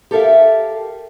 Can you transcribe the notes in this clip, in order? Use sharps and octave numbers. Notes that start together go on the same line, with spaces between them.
G4 A4 A#4 E5 F5